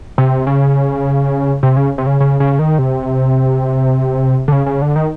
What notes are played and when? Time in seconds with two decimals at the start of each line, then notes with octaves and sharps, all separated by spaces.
0.18 C3
0.47 C#3
1.63 C3
1.77 C#3
1.98 C3
2.06 C#3
2.20 C#3
2.40 C#3
2.59 D#3
2.78 C3
4.48 D3
4.52 C#3
4.66 C#3
4.82 D3
4.96 D#3